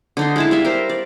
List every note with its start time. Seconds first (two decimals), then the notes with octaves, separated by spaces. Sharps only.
0.17 D3 D#4 C6
0.36 G#3 E4 A5
0.51 G3 E5 F5
0.65 A#4 C5
0.89 D5